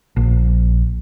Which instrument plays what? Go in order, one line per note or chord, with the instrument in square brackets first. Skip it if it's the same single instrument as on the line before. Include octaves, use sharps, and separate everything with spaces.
[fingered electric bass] A#1